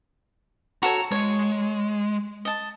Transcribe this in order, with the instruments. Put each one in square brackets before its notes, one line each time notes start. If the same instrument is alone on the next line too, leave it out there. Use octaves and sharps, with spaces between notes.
[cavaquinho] F#4 A4 C#5 [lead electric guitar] A#5
[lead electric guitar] G#3 [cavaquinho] C#5
[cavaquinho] D#5 A5